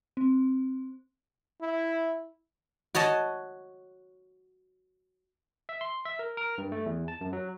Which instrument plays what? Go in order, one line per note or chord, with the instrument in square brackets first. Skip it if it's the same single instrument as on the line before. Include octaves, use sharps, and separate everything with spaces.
[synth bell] C4
[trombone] E4
[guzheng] F#4 C#5 D#5 A5
[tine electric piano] E5
C6
E5
A#4
A#4
G2
A3
E2
A5
F#2
F#3